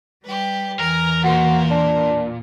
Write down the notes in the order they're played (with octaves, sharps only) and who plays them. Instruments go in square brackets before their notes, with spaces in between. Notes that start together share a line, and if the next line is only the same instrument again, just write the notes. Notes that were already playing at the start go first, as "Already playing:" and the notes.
[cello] G3 [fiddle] G4 B4
[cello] E2 E3 [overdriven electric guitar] A#4 [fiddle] G#5 A#5
[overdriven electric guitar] A#2 [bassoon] F#4 [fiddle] A#4 C5
[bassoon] D4